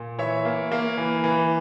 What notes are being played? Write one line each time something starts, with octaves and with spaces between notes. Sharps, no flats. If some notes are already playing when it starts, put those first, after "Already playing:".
Already playing: A#2
E3 C#5 E5
A#3
A#3
E3
E3